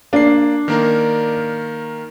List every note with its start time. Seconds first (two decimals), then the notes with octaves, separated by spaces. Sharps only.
0.13 A#3 D4 C7
0.68 D#3 A#3 A#4